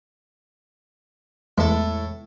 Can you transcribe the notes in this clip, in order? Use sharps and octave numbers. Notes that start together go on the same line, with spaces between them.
E2 A2 G#3 A4